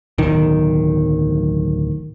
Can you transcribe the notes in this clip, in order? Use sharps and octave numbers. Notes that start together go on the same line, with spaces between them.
D1 B1 D#3